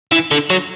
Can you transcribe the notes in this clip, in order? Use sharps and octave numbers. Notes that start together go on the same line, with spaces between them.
E3
D3
F#3